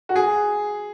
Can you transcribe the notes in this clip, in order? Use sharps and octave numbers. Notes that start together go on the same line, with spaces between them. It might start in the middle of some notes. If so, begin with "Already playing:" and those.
F#4
G#4